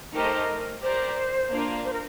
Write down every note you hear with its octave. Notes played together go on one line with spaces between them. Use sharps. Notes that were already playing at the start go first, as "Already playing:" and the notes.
A3 D#4 G4 A#4 C5 D#5
G4 A#4 C5 D5
A#3 D4 F4 A#4
C5
A#4